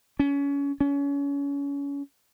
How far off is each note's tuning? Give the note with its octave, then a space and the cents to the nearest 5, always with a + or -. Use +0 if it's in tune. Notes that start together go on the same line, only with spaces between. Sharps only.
C#4 +25
C#4 +30